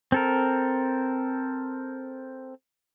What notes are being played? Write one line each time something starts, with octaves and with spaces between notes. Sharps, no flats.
C4 A4 A#4